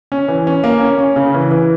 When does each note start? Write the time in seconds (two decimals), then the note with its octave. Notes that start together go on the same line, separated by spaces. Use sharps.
0.12 C#4
0.28 E3
0.47 C#4
0.64 A#3
0.81 C#4
0.99 C#4
1.16 C#3
1.34 E3
1.51 E3